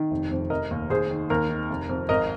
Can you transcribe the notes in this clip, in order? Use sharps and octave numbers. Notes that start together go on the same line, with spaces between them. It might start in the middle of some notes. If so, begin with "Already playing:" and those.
Already playing: D#3
F1
F2
F1 A#4 D#5
D#2
D#2 G#4 C5
D#3
D#2 A#4
D#3
F1
F2
G#1 A#4 D#5